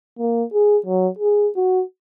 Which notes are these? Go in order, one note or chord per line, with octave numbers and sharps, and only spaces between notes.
A#3
G#4
F#3
G#4
F#4